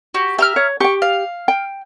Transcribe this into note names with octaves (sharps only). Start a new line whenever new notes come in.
F#4 G4
G4 E5 A#5 F6
C#5
G4 G5 C#6
F5
G5